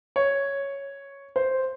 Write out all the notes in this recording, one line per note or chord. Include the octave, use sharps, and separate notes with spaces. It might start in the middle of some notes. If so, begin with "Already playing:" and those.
C#5
C5